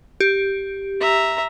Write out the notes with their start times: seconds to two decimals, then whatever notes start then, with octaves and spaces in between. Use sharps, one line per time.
0.20 G4
1.00 E5 A#5